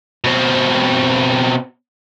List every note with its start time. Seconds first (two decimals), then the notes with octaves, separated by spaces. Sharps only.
0.24 B2 C4